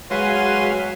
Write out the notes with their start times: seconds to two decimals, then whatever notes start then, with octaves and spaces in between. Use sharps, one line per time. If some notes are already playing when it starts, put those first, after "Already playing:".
0.11 F#3 G#3 F#4 B4 F5 G#5 C6